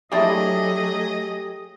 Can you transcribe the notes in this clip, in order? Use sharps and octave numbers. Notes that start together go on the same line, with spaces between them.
F#3 G#3 A3 D4 E4 G4 G#4 D#5